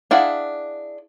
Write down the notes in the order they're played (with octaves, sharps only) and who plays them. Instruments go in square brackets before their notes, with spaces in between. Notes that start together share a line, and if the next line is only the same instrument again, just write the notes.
[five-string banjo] D4 E4 G#4 F5 F#5